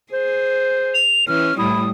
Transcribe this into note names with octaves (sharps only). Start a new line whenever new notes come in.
G#4 C5
F7
E3 C#4 F6
A2 G3 E4 D#6